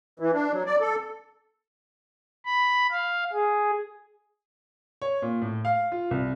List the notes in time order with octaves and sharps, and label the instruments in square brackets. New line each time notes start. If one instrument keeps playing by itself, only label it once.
[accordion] E3
D4
F#3
D5
A4
[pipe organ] B5
F5
G#4
[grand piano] C#5
A#2
A2
F5
F4
C2